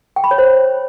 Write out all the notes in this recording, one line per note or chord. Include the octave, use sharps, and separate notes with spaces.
G5
B5
C#5
C5